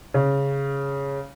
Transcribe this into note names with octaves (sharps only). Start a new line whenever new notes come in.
C#3